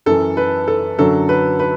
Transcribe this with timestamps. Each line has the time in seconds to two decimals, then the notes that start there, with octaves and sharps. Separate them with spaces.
0.06 F#2 E3 A4
0.37 B4
0.68 A4
0.99 F#2 D3 F#3 A4
1.29 B4
1.59 B4